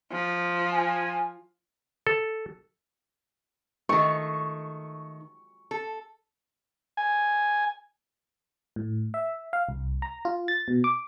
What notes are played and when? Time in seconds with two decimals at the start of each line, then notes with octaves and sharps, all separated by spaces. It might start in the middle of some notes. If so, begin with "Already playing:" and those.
0.12 F3
0.72 G#5
2.07 A4
3.89 D#3 A3 C#6
5.71 A4
6.97 G#5
8.76 A2
9.14 E5
9.53 F5
9.69 C2
10.02 A#5
10.25 F4
10.48 A6
10.68 B2
10.84 D6